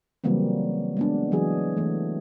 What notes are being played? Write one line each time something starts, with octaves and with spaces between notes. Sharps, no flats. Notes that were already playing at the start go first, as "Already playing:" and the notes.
C#3 E3 F#3 G3 A#3 C4
G#3 B3 D4
E3 F#3 G#4
E3 A3